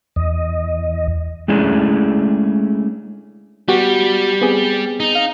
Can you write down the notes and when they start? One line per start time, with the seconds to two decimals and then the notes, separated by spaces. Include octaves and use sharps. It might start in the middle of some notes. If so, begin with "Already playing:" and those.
0.16 E2 D#5
1.48 G#3 A3 C#4 D4 E4 G#4
3.68 G3 B3 F#4 G4
4.42 B3 C4 G#4
5.00 D#4
5.15 F5